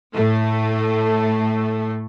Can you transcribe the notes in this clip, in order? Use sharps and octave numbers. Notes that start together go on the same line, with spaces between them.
A2 A3